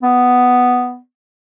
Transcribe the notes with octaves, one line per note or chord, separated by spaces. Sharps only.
B3